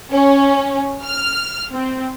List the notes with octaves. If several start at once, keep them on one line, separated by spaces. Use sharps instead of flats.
C#4
F6
C4